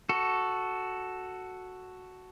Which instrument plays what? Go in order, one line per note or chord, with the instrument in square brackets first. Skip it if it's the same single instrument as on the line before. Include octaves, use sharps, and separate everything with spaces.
[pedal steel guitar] F#4 A4